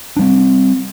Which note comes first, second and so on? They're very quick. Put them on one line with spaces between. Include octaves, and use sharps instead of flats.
D4 G3 C4